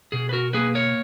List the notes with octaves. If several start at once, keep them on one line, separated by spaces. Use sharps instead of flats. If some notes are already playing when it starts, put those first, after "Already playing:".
B2 G#4
B4
F#4 A#4
A#3 G#4 B4
A#4 C#5